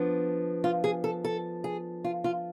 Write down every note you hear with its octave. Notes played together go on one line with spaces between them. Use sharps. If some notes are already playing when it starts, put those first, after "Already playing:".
Already playing: F3 B3 D4
F4
G#4
A4
A4
G#4
F4
F4